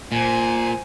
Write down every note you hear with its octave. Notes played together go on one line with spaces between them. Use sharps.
A#2 C5 G#5